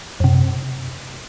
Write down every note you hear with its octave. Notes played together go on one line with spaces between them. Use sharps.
F#2 C3